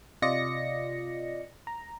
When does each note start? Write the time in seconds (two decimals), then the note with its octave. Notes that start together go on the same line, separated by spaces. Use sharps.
0.22 C3 F4 D5 D#5 A#6 C#7
1.67 A#5